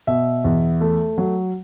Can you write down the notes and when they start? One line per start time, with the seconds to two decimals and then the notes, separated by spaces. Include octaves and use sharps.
0.07 B2 E5
0.44 E2
0.81 A3
1.18 F#3